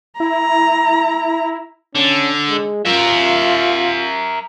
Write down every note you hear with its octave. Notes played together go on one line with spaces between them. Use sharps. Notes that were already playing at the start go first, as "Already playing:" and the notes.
E4 A#5
D3 C#4
G#3
F4 A#4 E5